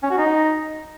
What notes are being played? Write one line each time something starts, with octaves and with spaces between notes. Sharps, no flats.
C#4
F#4
D#4